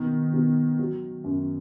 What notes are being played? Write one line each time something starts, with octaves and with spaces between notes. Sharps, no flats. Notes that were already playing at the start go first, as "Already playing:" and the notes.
Already playing: B2 D#3
B2
F#3
F#2